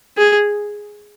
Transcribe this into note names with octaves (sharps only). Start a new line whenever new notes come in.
G#4